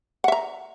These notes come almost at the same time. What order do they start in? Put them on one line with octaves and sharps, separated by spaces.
F#5 E5 A#5